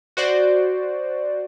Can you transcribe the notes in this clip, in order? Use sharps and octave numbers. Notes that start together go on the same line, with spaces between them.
F#4 C5 D5